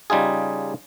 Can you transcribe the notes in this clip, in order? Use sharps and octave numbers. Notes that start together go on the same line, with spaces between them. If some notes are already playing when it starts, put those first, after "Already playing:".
C#3 G3 D#4 F4 G#4